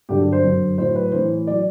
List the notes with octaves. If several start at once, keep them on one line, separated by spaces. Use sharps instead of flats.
G2 D3 F#3 G4
A4
C5
F#2 D3 F#3
A2 F#3 C5
B4
A2 E3 C5
F#3 D5